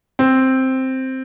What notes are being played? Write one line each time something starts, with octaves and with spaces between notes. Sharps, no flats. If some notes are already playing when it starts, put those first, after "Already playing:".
C4